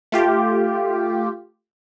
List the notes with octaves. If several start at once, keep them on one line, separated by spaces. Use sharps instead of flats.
A3 F4 G4